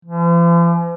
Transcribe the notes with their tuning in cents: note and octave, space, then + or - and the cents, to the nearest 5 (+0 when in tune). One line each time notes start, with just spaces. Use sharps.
F3 -45